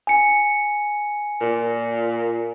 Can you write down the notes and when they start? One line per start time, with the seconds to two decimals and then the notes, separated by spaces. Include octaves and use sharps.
0.07 G#5 C#7
1.41 A#2